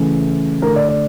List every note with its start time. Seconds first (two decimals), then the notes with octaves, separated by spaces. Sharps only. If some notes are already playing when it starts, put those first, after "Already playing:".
Already playing: C#3 E3 A3
0.62 A3 A#4
0.67 D3
0.76 D5
0.89 D5